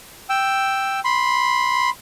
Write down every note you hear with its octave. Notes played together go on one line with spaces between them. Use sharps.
G5 E6
B5 C6